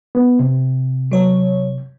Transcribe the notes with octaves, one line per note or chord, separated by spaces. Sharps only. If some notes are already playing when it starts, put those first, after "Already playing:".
B3
C3
F#3 C#5